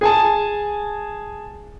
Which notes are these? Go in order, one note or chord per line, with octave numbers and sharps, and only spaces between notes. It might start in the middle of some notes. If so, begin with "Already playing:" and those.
G#4 G#5 A5